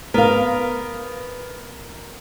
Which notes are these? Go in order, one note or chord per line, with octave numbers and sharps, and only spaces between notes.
B3 A#4 F5